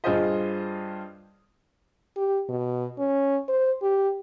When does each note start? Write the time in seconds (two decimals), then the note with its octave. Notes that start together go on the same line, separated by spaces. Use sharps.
0.04 G2 F4 G#4 C5 D#5
2.17 G4
2.49 B2
2.98 C#4
3.49 C5
3.82 G4